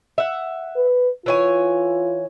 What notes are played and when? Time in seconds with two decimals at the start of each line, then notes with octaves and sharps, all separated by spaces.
0.18 E5 F#5
0.76 B4
1.26 E3 F4 C#5 G#5